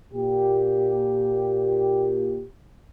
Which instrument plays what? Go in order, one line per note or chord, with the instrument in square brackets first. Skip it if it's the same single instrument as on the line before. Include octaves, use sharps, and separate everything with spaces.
[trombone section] A#2 G4